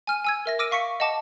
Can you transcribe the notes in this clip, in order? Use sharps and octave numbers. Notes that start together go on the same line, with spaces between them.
G#5 F6 D#7
G#5 E6 G#6
A#4 E5 A#6
D6 E6 F6 A#6 D7 D#7
F5 C#6 B6 C#7
D#5 F#5 A5 D6